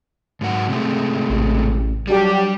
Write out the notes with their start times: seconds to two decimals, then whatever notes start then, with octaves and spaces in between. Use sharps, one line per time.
0.41 G#2 F#3 F#5
0.69 C3 G#3 A3
1.29 A1
2.07 F#3 G3 D4 G4